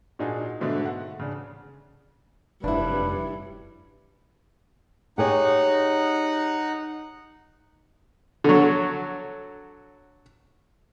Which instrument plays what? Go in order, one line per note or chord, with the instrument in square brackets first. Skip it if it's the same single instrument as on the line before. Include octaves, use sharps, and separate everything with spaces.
[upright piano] A#2 D4 D#4 F#4 G#4
G#2 B2 D3 A3
F#5
C#3 D4
[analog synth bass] F1 [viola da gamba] G2 F#3 [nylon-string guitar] D4 E4 [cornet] B4
[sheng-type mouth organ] D#4 F#5 [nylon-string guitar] G4 G#4 C#5
[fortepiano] D3 F#3